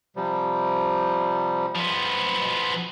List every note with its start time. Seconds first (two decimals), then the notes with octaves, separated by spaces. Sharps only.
0.16 C3 F3 G3
1.76 F3 B3
2.39 B2